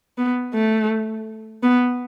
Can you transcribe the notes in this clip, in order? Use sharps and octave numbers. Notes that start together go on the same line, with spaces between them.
B3
A3
B3